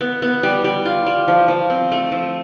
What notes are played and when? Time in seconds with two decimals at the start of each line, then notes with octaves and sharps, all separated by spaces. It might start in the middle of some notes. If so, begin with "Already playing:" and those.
0.01 B3
0.22 B3
0.43 G3
0.64 G3
0.85 F4
1.06 G3
1.28 F3
1.48 F3
1.70 C4
1.92 A3
2.12 F3